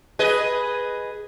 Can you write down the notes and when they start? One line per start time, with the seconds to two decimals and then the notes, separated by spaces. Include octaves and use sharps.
0.19 G#4 B4 D#5